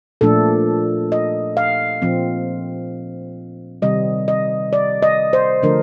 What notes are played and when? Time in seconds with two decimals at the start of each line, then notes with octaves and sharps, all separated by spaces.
0.21 A#2 F3 A3 D4 A4
1.12 D#5
1.57 F5
2.02 A#2 F3 C4
3.82 C3 D#3 G3 C4 D#5
4.28 D#5
4.73 D5
5.02 D#5
5.33 C5
5.63 D3 F3 A3 D4 A#4